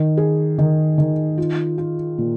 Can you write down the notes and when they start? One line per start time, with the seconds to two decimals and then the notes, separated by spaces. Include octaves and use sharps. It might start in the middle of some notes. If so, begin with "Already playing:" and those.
Already playing: D#3
0.17 G#4
0.58 D#3
0.98 D#3
1.38 F4
1.78 F4
2.18 A#2